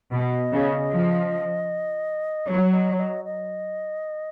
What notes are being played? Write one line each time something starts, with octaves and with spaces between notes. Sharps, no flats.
B2 D#5
C#3
F3
F#3 C#5
D#5
C#5
D#5
D#5